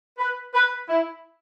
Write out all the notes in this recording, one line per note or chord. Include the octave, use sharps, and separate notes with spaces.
B4
B4
E4